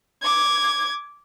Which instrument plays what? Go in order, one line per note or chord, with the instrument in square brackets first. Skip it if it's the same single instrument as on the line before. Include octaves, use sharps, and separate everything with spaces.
[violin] D6 G#6